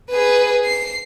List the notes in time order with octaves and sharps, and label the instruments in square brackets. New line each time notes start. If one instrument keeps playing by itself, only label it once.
[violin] G#4 B4
C7